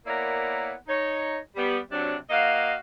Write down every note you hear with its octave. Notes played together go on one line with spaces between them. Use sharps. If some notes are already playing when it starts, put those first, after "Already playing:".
A#3 B3 E4 A#4 C#5 D5
D#4 C#5
G3 B3
C3 F#3 D4
A#3 F#4 D#5 F5